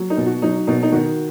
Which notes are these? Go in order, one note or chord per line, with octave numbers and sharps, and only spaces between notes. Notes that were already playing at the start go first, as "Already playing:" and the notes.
Already playing: F#3
D#4
B2
F#4
F#3 D#4
B2 D#4
D#4
D#3 F#4